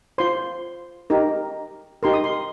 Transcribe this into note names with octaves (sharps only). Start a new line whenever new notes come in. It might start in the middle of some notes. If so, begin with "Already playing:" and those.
F4 C5 C6
D#4 G4 A#4
D#4 G4 A#4 C6
D#6
C6